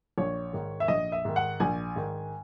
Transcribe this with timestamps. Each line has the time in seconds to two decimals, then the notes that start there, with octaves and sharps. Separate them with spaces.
0.18 A#1 C#5
0.53 G#2 D#3
0.80 E5
0.88 A#1 D#5
1.12 E5
1.25 G#2 D#3
1.36 F#5
1.60 A#1 G#5
1.96 G#2 D#3